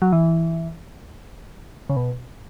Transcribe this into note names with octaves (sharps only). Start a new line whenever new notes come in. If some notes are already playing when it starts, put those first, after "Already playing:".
F#3
E3
C#3
B2